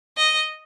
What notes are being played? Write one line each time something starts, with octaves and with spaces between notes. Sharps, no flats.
D#5